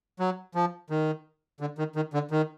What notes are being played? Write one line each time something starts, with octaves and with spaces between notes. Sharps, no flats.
F#3
F3
D#3
D3
D#3
D#3
D3
D#3